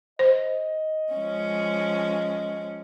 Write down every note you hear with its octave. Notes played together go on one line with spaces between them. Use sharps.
C5 D#5
F3 G#3 C#4